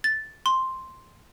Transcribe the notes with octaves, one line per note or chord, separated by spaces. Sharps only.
A6
C6